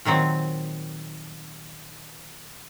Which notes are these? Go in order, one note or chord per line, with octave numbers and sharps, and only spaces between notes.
A#2 D#3 F#3 C4